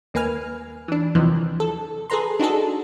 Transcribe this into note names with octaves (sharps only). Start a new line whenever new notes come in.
D#2 A#3 B4 G#5 F6
E3 D4
D#2 C3 E3 F3
A4
G#4 A4 B4 A#5 C6
D4 D#4 F#4 G#4 A4